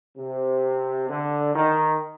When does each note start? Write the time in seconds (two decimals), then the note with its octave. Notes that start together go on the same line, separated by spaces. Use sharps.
0.18 C3
1.09 D3
1.55 D#3